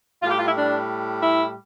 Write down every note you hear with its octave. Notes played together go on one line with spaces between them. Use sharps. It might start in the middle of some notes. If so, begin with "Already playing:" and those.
A2 G3 F4
G4
F4
E4
D4
E4